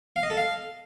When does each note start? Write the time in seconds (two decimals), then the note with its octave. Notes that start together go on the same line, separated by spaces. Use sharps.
0.16 F5
0.23 D#5
0.30 A4
0.37 F5